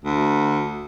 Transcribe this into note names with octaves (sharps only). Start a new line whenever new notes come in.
D2